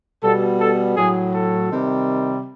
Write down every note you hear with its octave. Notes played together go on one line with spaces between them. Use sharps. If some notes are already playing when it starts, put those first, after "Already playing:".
B2 G3 A4
A4
A2 F#3 G#4
A4
C3 D#3 G3